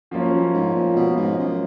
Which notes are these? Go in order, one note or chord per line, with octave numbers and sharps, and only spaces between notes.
F#2 F3 A#3 C#4
F#2
G#2
A#2
B2
G#2
F#2